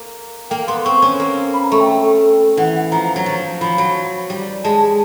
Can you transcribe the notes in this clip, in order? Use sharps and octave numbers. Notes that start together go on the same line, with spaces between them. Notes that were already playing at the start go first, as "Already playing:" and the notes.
Already playing: A#3
A#3 G5
B3 C6
C4 C#6
C#4
A#3
B5
A#5
A3 C#6
G5
E3 F#5
F#5
F3 A#5
F#3
F3
F3 B5
F#3
G3
G#3 A5